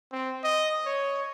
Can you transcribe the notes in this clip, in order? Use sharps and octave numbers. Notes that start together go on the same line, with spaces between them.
C4
D#5
C#5